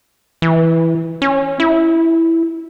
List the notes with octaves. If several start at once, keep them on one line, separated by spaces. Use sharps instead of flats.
E3
C#4
E4